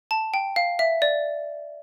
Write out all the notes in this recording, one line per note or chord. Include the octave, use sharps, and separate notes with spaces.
A5
G5
F5
E5
D5